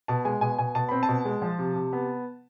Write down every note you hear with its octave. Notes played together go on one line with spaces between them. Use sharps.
B2 A5
G#3 G#5
B2 G#5
B2 G#5
B2 A5
C4 B5
A5
B2
G#3
F3
C3
C3
B3